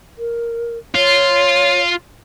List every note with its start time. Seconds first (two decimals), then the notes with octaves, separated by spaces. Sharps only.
0.18 A#4
0.95 F4 C#5